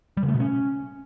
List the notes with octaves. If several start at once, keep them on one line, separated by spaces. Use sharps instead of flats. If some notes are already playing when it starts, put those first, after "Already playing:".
G3
C#3
A3
B2
C#4